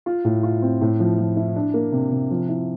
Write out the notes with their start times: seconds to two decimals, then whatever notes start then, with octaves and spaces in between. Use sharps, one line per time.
0.06 F4
0.25 A2
0.43 F4
0.62 C4
0.81 A2
1.00 F3
1.18 F3
1.36 E4
1.56 D4
1.74 A#3
1.92 C3
2.12 C3
2.31 F3
2.49 E4